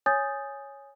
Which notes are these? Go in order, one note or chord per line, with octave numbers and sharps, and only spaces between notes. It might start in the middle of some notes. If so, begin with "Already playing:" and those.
C#5 G#5 D#6 G6 A6